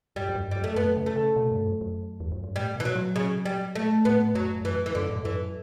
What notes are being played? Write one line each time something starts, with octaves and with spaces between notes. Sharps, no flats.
G2 G3
F#2
G2
F#2 G3
A3
F#2 B3
C#3
A3
C#3
B2
G2
F#2
F#2
E2
F#2
G2
A2 G3
B2 E3
F#3
F#3
C#3
G3
A3
A2 B3
F#2 F#3
G2
F#2 E3
E3
F#2 D3
A2
G2
F#2 E3